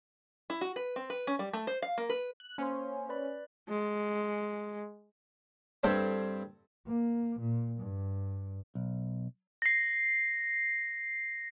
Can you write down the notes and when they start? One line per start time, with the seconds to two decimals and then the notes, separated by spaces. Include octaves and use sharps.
0.50 E4
0.61 F#4
0.76 B4
0.96 C4
1.10 B4
1.27 C#4
1.39 G3
1.53 A3
1.67 C5
1.82 F5
1.98 A#3
2.10 B4
2.40 F#6
2.58 A#3 C#4 C5 C6
3.09 B4 D5 B5
3.69 G#3
5.83 G2 C4 A4 C5
6.87 A#3
7.40 A#2
7.79 G2
8.75 B1
9.62 A#6 C7